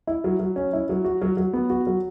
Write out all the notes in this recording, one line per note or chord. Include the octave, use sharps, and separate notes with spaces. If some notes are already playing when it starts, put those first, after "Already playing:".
E4
F#3
F#3
C#4
E4
F#3
F#4
F#3
F#3
B3
F#4
F#3